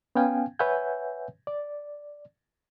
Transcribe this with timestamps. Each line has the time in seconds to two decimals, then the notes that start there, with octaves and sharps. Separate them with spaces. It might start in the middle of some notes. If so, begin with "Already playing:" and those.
0.15 B3 C#4 F5 G5 G#5
0.59 B4 C#5 E5 F#5 G#5 G6
1.47 D5